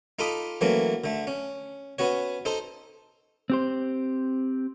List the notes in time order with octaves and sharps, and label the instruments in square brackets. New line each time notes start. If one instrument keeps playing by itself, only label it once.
[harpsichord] D#4 F4 A4 B5 D6 D#6
E3 F#3 A3 A#3 C#4
D3 A3
C#4
B3 C#4 F#4 C#5
D#4 A4 C5
[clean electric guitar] C4 G4 C5